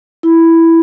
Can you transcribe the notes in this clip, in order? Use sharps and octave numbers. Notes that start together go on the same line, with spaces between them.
E4